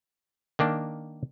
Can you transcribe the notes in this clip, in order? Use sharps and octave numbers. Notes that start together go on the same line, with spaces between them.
D#3 A#3 D4